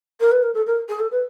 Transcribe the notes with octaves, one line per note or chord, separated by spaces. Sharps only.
A#4
B4
A#4
A4
A#4
G#4
A4
B4